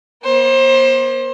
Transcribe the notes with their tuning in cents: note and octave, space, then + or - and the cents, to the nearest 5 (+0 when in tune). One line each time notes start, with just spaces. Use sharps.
B3 -45 C5 +30